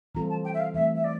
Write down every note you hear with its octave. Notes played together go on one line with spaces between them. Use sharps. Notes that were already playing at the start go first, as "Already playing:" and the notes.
E3 G3 C4 F4 A4 A#5
A5
G5
E5
F5
E3 A3 C4 E5
E5
D5